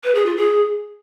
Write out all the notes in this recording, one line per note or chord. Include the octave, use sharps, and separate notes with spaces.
B4
G#4
F4
G#4